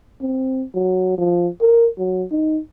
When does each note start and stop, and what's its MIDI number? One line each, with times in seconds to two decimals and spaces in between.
0.21 0.64 60
0.74 1.13 54
1.18 1.48 53
1.61 1.88 70
1.98 2.24 54
2.31 2.59 63